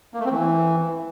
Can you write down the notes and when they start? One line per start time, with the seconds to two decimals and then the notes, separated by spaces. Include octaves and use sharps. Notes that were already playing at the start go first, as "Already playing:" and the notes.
0.14 A#3
0.20 A3
0.25 C4
0.31 E3